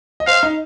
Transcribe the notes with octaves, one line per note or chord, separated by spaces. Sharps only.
D#5
C5 F5
D#4